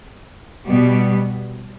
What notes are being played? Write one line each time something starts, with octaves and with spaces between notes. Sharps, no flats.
B2 G3 B3